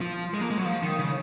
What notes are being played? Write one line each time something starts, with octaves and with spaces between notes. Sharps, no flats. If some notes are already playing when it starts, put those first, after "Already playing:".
F3
G#3
A#3
G#3
F#3
F3
D#3
C#3